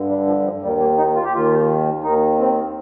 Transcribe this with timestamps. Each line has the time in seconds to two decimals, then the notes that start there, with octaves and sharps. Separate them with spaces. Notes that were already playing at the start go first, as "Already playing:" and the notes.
Already playing: G2 D3
0.09 G3
0.27 F3
0.39 G3
0.44 F3
0.62 D#2 D#3 G3
0.80 A#3
0.98 D#4
1.15 F4
1.24 G4
1.33 D#2 D#3 F4
2.03 D#2 D#3 D#4
2.39 C4